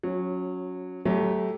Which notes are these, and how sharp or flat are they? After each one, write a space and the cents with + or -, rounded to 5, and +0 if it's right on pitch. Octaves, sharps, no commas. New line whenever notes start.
F#3 -20 C#4 +0
F#3 +25 A3 -10 G4 +0